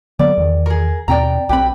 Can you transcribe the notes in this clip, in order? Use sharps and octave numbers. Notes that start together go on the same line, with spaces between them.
D3 F#3 B3 D5
E2 D#3
G#4 A#4
D#2 B2 C4 D5 G5 A#5
B1 C4 G4 B4 B5